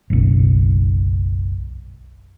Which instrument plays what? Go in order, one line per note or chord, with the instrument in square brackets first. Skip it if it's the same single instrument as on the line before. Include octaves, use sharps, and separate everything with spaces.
[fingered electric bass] F#1 B1